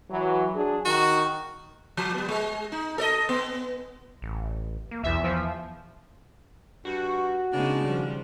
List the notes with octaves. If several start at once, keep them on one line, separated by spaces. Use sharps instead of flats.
E3 F#3
F#3 D4 G#4
D#3 F#4
F3
G3 B3
G#3
D#4
A4 D5 D#5
B3
A1
A#3
B1 E2 E5
E3 F3
G2 F#4
C#3 G#3 B3 D4 D#4
D#3 F3 G3